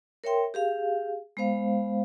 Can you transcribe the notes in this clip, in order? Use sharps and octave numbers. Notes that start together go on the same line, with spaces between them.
A#4 C#5 E5 G5 C6
G4 G#4 F5
G#3 B3 C5 F5